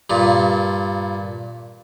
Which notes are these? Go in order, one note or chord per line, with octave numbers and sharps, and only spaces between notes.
G2 A#2